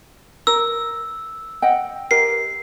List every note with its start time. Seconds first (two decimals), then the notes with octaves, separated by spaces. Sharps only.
0.47 A#4 E6
1.62 D#5 F#5 G5
2.11 G4 A#4 C7